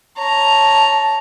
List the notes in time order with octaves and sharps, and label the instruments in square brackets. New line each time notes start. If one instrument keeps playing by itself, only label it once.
[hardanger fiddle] C#5 A#5 [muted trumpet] A5